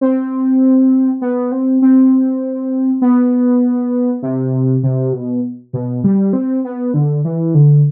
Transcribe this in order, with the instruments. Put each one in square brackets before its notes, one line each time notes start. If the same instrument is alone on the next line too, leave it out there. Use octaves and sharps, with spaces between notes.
[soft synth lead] C4
B3
C4
C4
B3
C3
C3
B2
B2
G3
C4
B3
D3
E3
D3